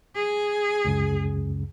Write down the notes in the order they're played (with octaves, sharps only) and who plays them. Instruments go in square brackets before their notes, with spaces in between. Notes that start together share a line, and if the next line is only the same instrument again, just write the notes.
[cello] G#4
[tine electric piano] C#2 F#2 C#3